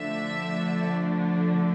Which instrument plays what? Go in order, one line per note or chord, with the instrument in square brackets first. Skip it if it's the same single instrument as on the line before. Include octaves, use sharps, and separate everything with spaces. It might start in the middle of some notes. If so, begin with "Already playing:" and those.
Already playing: [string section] D3 F3 A3 D4 E5